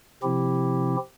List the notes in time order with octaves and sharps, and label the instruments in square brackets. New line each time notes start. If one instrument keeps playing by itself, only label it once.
[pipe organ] C3 F3 C4 E4 G4